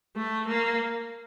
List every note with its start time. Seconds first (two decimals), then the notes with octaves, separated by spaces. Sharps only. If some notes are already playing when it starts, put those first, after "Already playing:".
0.16 A3
0.47 A#3